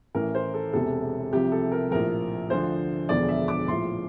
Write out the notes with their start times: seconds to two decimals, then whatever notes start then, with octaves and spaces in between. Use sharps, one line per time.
0.15 A1 A2 E3 A#4
0.35 C5
0.54 A4
0.73 E1 E2 C3 A4
1.32 C2 C3 F3 G4
1.52 A4
1.72 A#4
1.91 A#1 A2 F3 A#4
2.50 D2 D3 F3 C5
3.09 E1 E2 D3 F3 D5
3.29 E5
3.48 D6
3.68 A#1 A2 F3 C6